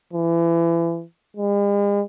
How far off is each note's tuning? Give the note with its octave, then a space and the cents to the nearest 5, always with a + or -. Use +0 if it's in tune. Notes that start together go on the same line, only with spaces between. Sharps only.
E3 +30
G#3 -45